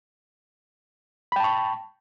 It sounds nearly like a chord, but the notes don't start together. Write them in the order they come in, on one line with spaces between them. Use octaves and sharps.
B5 G5 A5 C#6